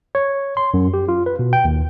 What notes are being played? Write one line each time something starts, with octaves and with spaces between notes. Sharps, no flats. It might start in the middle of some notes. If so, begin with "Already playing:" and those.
C#5
C6
F#2
G4
F4
B4
B2
G5
D#2